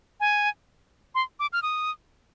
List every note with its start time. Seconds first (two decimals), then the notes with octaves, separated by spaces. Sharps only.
0.20 G#5
1.15 C6
1.40 D6
1.53 F6
1.63 D#6